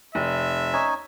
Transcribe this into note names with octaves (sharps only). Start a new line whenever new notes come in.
F1 E5
C#4 D#4 G#5